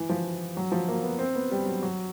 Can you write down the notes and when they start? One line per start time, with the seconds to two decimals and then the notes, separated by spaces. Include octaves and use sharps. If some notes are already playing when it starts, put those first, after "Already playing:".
Already playing: E3
0.09 F3
0.57 F#3
0.72 F3
0.88 A#3
1.03 B3
1.19 C4
1.35 B3
1.51 G3
1.66 F#3
1.82 F#3